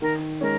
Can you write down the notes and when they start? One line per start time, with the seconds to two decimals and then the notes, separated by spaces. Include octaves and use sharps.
0.01 D#3 A#4
0.41 G#3 C#4 A#4